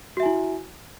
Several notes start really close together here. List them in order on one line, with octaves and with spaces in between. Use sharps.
F#4 E5 G#5 E4